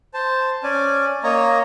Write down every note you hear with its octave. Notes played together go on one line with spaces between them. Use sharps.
C5 A5
C#4 D5 G#5
A#3 C#5 D#5 A#5